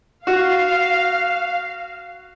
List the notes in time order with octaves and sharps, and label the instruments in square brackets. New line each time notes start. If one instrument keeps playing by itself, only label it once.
[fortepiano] F#4 [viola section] F5